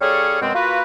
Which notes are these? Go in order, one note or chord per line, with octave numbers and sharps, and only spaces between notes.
G3 C#4 G#4 A4 C#5 F5
F#2 B2 G#3 C4
A#3 F4 F#4 A#4 B4